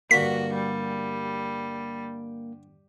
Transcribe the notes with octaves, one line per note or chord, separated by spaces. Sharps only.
G2 D3 A#3 F#4 A#5 B6
G3